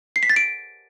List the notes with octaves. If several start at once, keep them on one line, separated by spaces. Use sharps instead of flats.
C7
B6
A6
D7